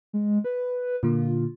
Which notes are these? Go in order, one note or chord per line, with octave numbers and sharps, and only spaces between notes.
G#3
B4
A#2 D3 A#3 F4